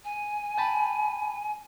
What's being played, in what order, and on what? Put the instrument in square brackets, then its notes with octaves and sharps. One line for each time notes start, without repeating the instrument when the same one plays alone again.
[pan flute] G#5
[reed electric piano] G5 A5 B5